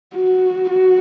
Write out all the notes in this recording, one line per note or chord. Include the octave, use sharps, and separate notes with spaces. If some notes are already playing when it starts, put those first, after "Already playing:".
F#4
F#4